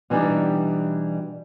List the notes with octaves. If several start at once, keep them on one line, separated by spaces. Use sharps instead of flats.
B2 E3 G3 D4 D#4 G4